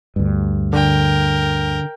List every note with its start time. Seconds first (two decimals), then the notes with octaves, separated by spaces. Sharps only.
0.16 D2 G2
0.73 D3 A#4 G5